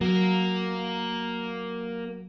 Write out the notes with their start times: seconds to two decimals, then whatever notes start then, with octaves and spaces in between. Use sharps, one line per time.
0.01 F#3 A#3 A#4